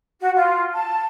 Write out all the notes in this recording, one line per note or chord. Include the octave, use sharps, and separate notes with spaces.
F#4
F4
A5